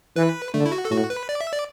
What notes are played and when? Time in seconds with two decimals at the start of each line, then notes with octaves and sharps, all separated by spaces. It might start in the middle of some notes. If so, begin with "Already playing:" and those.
0.16 E3 B4
0.54 D3 A3
0.66 E4
0.72 F#4
0.85 A4
0.91 A2 F#4
1.10 B4
1.29 D5
1.41 E5
1.53 D5